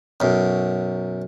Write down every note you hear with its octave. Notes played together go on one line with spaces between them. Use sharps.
B1 F#2